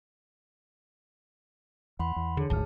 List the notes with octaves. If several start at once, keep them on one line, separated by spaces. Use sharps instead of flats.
E2 F#5 B5 C6
E2
D3 G#4 C#5
D1 G#1 D2 G#2 A5 F6